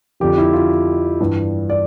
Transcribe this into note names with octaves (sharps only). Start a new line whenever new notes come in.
F2 D3 F3 G4
E4
F4
G2 E3 G3
D5